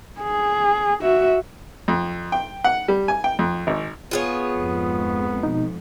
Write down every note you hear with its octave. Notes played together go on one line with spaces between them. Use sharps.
G#4
F#4 E5
F2
G5
F#5
G3
G#5
G5
F2
G#1
B3 F4 G#4 C#5
F2 G#2
B2 D#4